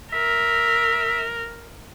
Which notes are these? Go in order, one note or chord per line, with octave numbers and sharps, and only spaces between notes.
A#4 E5